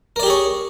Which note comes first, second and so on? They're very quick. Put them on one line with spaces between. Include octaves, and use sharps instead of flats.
A#4 D5 G4 G#4 C#5